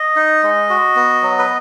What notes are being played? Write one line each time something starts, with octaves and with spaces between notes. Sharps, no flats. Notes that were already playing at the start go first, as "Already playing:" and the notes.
Already playing: D#5
D#4
G#3
F#4
B3
F#3
B4